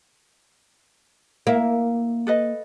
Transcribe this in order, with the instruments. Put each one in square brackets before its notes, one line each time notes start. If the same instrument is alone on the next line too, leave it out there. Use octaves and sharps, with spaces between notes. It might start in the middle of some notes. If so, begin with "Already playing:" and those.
[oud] A#3 [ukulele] E4 E5
[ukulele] A4 B4 D#5